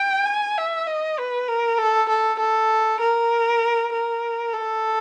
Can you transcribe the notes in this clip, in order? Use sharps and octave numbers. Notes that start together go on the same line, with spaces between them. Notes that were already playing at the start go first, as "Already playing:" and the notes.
Already playing: G5
G#5
E5
D#5
B4
A#4
A4
A4
A4
A#4
A#4
A4